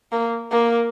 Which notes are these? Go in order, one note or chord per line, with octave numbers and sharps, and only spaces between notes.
A#3
A#3